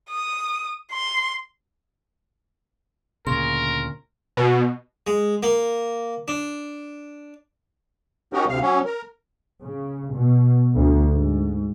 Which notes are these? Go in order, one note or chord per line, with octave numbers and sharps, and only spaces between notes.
D#6
C6
D2 A#2 C#3 A#4 C6
B2
G#3
A#3
D4
C#4 D#4 F#4 G4 A#4
D2 C3 F5
F#3 C#4
A#4
C#3
B2
D2
G#2